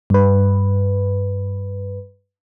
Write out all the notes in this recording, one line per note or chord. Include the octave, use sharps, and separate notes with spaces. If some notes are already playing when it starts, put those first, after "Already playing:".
G2 B4